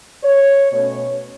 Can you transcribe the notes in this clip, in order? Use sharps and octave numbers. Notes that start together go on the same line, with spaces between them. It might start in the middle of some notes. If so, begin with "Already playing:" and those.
C#5
B2 A3 C#4 C#5